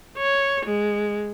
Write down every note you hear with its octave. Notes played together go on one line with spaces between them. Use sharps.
C#5
G#3